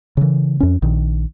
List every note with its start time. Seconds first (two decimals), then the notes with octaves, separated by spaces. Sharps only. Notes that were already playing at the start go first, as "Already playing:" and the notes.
0.17 C#3 E3
0.60 F2 C#4
0.82 A#1 D#3